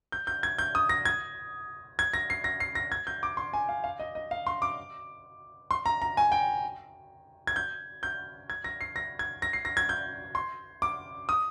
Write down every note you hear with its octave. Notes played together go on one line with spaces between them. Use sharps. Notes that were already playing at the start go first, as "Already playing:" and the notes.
G6
G6
G#6
G6
D#6
A#6
G#6
G#6
A#6
C7
A#6
C7
A#6
G#6
G6
D6
C6
G#5
F5
F5
D#5
D#5
F5
C6
D6
C6
A#5
A#5
G#5
G5
G#6
G6
G6
G#6
A#6
C7
A#6
G#6
A#6
C7
A#6
G#6
G6
C6
D6
D#6